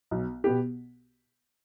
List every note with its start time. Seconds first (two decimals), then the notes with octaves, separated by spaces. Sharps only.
0.11 B1
0.44 B2 B3 G4